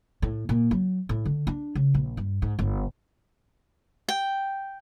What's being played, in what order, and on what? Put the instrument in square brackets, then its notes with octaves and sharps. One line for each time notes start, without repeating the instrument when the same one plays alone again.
[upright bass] A2
A#2
F#3
A2
D3
D4
C#3
A#1
G2
G#2
G1
[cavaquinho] G5